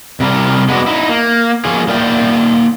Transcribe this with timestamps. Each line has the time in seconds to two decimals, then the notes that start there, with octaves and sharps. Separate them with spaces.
0.20 C3 G3 A#4
0.69 G#3 B3 D4 F#4
0.86 D#4 E4
1.09 A#3
1.65 F3 A#3 C#4 F4 G#4
1.88 A#3 A#4 D5 E5 G5